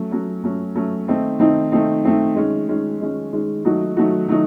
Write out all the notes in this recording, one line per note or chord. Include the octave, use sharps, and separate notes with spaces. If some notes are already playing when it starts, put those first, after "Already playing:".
Already playing: F#3 A3 C#4
F#3 A3 C#4
F#3 A3 C#4
F#3 A3 C#4
D#3 A3 C4 D#4
D#3 A3 C4 D#4
D#3 A3 C4 D#4
D#3 A3 C4 D#4
D#3 G#3 C#4
D#3 G#3 C#4
D#3 G#3 C#4
D#3 G#3 C#4
D#3 F#3 A3 D#4 F#4
D#3 F#3 A3 D#4 F#4
D#3 F#3 A3 D#4